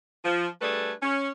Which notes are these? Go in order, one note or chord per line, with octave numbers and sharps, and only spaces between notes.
F3
G3 A3 D4 G#4 A4 B4
C#4